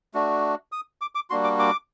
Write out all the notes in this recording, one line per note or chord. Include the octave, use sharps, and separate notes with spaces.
A3 D4 F#4
D#6
D6
D6
G3 A#3 D4 F#4 C6
D6
D6